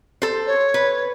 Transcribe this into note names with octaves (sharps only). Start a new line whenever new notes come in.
A4 C5
C#5
B4